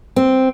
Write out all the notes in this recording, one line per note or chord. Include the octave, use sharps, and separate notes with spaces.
C4